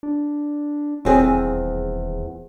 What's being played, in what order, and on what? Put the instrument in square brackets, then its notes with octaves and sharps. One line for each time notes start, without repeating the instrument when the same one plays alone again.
[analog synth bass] D4
[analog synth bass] D#1 [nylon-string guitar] E2 C4 G#4